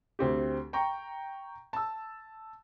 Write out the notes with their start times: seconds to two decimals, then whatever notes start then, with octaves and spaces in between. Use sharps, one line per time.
0.19 D2 C4 G4
0.73 G5 A#5 C#6
1.73 A5 E6